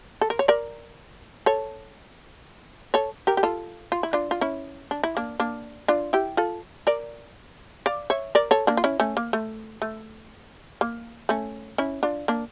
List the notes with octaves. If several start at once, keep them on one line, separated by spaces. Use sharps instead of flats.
A4
A#4
C#5
A#4 D5
A4 C#5
A4 C#5
G4 A#4
G4
F4 A4
F4
E4
D4 F4
F4
C#4 E4
D4
E4
A#3 D4
A#3 D4
D4 F4
E4 G4
F4 A4
A#4 D5
D5 F5
C#5 E5
A#4 D5
A4 C#5
A#3 D4
F4
C#4 E4
A3 C#4
A#3
A3
A3
A#3
A3 C#4
C#4 E4
D4 F4
A#3 D4